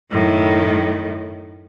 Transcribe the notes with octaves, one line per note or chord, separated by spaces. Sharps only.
F#2 A2 D#3